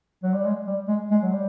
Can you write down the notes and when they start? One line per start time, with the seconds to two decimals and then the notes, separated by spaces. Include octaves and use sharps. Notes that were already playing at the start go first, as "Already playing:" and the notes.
0.23 F#3
0.34 G3
0.45 G#3
0.67 G3
0.88 G#3
1.11 G#3
1.22 F#3
1.32 G3